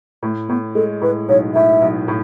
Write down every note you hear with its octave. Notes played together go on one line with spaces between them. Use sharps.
A2 A3
A2 B3
G#3 A4
A2 B4
B1 C#5
A2 E5
B1
A2